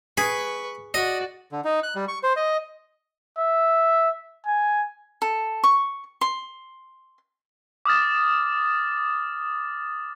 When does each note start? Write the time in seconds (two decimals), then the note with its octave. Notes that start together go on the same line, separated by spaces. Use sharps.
0.17 G#4 B4 B5 C#6
0.94 F#4 D5 D#5
1.52 D3
1.65 D#4
1.83 F#6
1.96 G3
2.08 C#6
2.23 C5
2.36 D#5
3.38 E5
4.46 G#5
5.22 A4
5.64 C#6
6.21 C6
7.86 D6 D#6 F6 A6